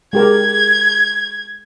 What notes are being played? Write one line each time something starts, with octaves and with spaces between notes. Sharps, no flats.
G#3 G4 A#4 G#6